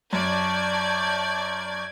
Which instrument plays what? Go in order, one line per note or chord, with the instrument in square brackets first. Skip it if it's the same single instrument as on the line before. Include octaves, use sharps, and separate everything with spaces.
[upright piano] F#2 [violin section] D5 G#6 [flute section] A5 C#6 G6